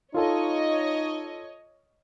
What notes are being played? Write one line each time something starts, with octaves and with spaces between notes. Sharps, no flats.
D#4 F4 A4 C#5 D#5 A5